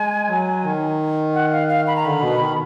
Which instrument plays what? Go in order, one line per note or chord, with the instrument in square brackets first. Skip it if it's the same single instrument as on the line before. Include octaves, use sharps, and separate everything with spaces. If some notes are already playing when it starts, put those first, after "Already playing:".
Already playing: [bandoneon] G#3 [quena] G#5
[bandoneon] F#3
D#3
[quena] F#5
F5
F5
B5
A#5
[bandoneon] D3 [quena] B5
[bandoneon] B2
D#3